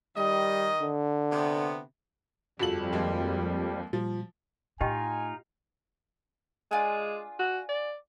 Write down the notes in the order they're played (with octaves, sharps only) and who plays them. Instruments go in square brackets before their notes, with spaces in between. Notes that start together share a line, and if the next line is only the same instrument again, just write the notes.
[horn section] D#3 D#5 [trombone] G3
[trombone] D3
[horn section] C3 B3
[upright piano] G1 A4 F#7 [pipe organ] F2 G3 [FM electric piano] F4 F#4 G#4
[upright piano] D#2 G#3 A#3
[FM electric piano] A#2 G3 [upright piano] F3
[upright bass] A2 [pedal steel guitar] D#4 F4 [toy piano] G4 D#5 G5 [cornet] G#5
[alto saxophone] G#3 [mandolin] D4 F4 G#4
[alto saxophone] F#4
D5